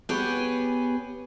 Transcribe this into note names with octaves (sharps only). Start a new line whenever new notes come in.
B3 G4 G#4 B4 C#5